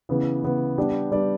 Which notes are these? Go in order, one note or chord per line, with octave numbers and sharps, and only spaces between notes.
C#3 E3 B3
C#3 E3 B3
G3 B3 D4 G4 D5
G3 B3 D4 G4 D5